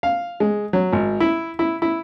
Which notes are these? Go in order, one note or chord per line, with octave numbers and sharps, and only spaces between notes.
F5
G#3
F#3
G#1
E4
E4
E4